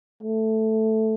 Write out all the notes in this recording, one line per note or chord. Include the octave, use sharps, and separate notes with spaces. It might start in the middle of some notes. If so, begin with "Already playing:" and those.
A3